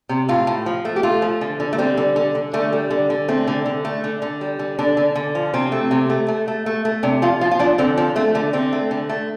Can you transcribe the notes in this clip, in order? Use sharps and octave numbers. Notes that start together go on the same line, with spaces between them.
C3
A2 F4
A2
F3
A3
G4
A3 F4
F3
D3
D3
A3
G3 C4
D3
D3
D3
D3 A3
G3
D3
D3
A3 C4
D3
D3
A3
D3
D3
G3
D3
D3 D4
D3
D3
F3
C3 C4
A3
C3
A3
A3
A3
A3
A3
C3 D4
F3 F4
F3 F4
F4
F3 D4
D3 C4
F3 C4
A3 C4
D3 A3
D3 C4
A3
D3
A3